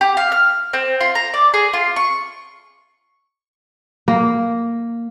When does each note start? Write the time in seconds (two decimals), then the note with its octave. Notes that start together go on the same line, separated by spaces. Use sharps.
0.01 G4
0.17 F5
0.32 F6
0.73 C4
1.00 F4
1.15 A#5
1.34 D5
1.54 G#4
1.73 F4
1.96 C#6
4.08 A#3